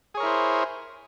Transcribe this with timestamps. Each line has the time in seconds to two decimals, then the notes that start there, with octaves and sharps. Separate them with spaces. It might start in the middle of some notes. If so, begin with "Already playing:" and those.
0.14 G#4
0.17 C#5
0.20 A#4
0.23 E4
0.26 C5